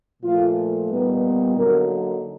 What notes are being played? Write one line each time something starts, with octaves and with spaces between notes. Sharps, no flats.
A#2 F3 A3 F4
A#2 G3 B3 D#4 B4
D3 F#3 A#3 D#4 A#4